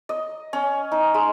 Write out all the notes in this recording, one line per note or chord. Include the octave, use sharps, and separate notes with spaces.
D#5
C#4
D#4
G#3